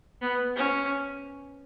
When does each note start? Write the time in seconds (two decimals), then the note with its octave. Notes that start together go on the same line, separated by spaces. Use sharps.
0.22 B3
0.56 C#4